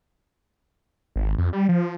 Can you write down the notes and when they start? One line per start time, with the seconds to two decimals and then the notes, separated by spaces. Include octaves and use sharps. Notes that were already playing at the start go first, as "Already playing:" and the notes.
1.16 G#1
1.38 F2
1.53 G3
1.69 F3